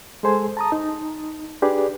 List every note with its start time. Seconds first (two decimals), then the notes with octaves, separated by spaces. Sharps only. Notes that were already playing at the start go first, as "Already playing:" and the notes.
0.23 G#3 G#4 A4 C5 G#5
0.57 A5 A#5 D#6
0.72 D#4
1.62 D4 G4 G#4 B4 D5